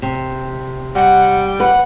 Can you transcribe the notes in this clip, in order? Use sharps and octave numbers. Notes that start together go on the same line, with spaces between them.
C3
G3 F#5
B4 F#5